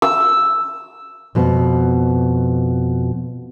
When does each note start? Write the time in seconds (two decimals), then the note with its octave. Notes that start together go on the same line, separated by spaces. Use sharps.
0.02 E6
1.35 F2 B2 B3